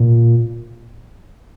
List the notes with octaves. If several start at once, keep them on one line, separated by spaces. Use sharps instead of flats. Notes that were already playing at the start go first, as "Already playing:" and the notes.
Already playing: A#2